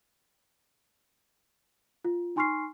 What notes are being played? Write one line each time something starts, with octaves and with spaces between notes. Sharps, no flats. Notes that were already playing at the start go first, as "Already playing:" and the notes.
F4
D#4 G#5 C6 C#6 F6 C7